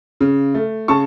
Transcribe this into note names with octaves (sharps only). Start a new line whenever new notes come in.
C#3
A3
C#3 A5 C#6